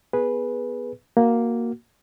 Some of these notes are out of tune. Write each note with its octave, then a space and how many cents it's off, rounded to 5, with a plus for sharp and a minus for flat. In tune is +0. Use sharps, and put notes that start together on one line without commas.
B3 +0 G#4 +0 B4 -10
A#3 +0 F#4 +0